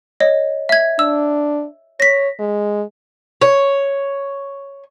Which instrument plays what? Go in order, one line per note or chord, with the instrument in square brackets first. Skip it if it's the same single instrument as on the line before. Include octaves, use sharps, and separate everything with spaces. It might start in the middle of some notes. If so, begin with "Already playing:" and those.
[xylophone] C#5 D#5
E5 G#6
[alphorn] D4 [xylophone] E6
[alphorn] C#5 [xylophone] A#6 B6
[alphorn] G#3
[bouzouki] C#5